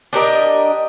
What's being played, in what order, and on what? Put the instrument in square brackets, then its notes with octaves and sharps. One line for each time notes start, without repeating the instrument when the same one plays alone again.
[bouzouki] D4 G4 A#4 D#5